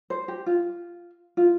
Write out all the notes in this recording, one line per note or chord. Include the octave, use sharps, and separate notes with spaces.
C5
G4
F4
F4